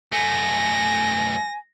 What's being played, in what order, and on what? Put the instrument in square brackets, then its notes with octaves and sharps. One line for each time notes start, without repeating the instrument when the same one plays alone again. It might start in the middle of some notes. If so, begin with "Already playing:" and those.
[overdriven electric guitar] F#2 A3 [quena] G#5 [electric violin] A#6